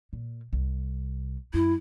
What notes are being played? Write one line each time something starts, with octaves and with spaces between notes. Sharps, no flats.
A#2
C2
F#2 E4